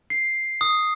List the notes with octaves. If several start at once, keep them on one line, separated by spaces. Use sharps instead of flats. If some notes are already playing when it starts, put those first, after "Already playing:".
C7
D#6